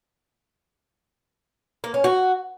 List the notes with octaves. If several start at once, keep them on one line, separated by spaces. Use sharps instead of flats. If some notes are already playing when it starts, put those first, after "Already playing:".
A#3
C#4
F#4